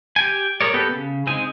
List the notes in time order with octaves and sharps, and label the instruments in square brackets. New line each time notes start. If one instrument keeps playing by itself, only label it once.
[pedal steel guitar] G4 G5 G#5
G#4 A#4 C#5 D5
B3 G4 A4 B4
C#3
G#3 C4 D#4 G#5